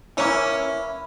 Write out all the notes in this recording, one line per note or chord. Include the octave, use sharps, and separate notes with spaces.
E3 A#3 C#4 E4